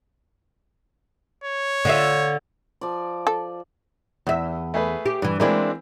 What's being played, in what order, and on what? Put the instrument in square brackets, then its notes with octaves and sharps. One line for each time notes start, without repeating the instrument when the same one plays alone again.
[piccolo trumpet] C#5
[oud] D3 F4 E5
[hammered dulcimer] F3 D5
[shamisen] A4
[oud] E2 E5
[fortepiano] A3 G#4 B4
[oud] G4
G2 E3
[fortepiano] E3 A#3 C4 [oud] G#3 D4 E4